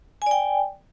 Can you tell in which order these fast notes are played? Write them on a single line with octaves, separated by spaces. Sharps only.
G#5 D5 G5